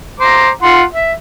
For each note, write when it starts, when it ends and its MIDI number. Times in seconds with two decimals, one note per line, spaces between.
0.20 0.50 72
0.20 0.50 82
0.20 0.50 86
0.63 0.83 65
0.63 0.83 78
0.63 0.83 84
0.93 1.13 76